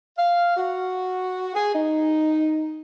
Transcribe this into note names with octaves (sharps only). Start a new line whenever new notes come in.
F5
F#4
G#4
D#4